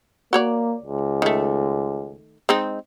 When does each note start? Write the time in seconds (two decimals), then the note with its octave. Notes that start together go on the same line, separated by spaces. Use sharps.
0.33 A#3 F#4 C#5 D5
0.82 C#2
1.22 D#3 A3
2.49 G#3 C4 D#4